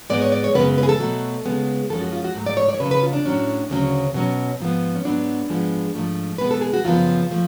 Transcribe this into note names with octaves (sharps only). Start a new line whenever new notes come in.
G#2 G#3 B3 D5
C#5
D5
C#5
F#2 C#3 G#3 B3 B4
B4
G#4
A4
B2 F#3 A3
C#3 G#3 B3
F#2 F3 G#3 C#4 A4
F#4
F4
F#4
G#2 F#3 A3
D5
C#5
D5
C#5
C#3 F#3 C#4 B4
B4
F4
D4
A2 F#3 C#4
D2 C#3 F#3 C#4
B2 F#3 C#4
G#2 F3 B3
C#4
G#2 F#3 B3 D4
G#2 F3 G#3 B3
G#2 F3 A3
B2 G#3 B3 B4
A4
G#4
F#4
F#2 C#3 F3 B3 F4
F3 A3